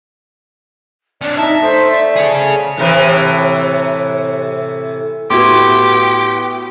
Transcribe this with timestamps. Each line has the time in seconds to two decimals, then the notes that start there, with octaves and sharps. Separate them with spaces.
1.22 C#4 D4 D5
1.38 D#4 E5 A5
1.61 A3 C5
1.90 D5
2.16 G#4 C#5
2.77 A2 C3 E3
5.30 A2 B3 E4 F#4 G4 B4 C6 D6